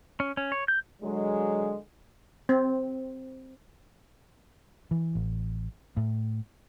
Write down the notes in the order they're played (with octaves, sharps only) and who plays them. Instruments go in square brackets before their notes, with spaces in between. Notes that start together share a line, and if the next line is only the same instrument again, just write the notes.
[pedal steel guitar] C#4
C#4
C#5
G6
[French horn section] D3 F#3 G#3
[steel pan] C4
[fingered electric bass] E3
A1
A2